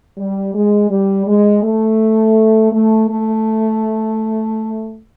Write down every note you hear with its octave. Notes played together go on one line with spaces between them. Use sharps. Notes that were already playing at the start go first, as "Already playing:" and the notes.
G3
G#3
G3
G#3
A3
A3
A3